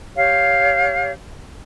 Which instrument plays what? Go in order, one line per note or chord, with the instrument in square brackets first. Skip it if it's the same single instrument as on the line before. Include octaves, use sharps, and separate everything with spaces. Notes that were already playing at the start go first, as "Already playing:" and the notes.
[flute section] G4 C#5 F5